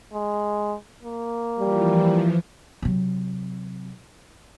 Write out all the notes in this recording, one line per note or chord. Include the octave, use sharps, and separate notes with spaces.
G#3
A#3
E3 F3 G3
C3 F#3